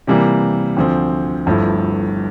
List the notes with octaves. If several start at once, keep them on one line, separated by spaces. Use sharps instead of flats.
C3 E3 G3 A#3
D2 D3 F3 C4
G1 G2 F3 A3 E4